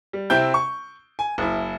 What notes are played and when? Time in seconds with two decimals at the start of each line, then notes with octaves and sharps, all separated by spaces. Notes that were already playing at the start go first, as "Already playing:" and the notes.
0.13 G3
0.30 C3 C4 E4 G5 G6
0.54 C#6
1.19 G#5
1.38 F#1 E4